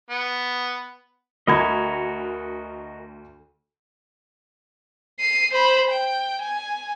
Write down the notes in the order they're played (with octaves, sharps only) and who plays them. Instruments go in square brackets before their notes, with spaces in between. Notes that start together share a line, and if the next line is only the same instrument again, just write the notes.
[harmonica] B3
[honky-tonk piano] D2 B5 G#6 [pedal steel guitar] F#4 A#4 D#5
[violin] C7 D#7
C5 B5
G5
G#5